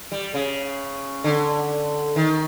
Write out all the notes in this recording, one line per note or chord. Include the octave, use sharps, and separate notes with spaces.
G3
C#3
D3
D#3